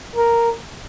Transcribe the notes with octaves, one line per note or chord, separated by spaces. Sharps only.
A#4